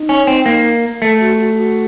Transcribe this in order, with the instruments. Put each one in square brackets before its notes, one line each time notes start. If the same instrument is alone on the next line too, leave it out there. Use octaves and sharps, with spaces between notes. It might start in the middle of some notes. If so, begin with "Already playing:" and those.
Already playing: [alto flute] D#4
[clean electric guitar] C#4
C4
A#3
[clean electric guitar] A3 [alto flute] A4
[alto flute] F#4
F#4
F#4